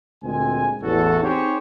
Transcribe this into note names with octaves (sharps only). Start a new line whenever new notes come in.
D2 A#2 G#3 C4 G#5
A1 E2 F#4 A4
C4 D#4 G4 G#4 C5 C#5